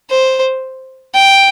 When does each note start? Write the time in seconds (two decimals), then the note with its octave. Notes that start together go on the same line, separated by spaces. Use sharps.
0.10 C5
1.14 G5